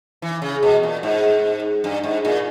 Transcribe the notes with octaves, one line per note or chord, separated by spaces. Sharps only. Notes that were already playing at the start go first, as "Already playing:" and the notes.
E3
C#3
B2
A#2
G#2
G2
G#2
A#2